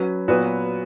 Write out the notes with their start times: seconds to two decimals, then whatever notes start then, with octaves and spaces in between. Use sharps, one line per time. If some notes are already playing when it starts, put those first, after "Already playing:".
Already playing: F#3 C#4 F#4 B4
0.28 A#2 F#3 B3 F#4 B4